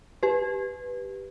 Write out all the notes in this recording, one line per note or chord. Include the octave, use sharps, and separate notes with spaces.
G4 B4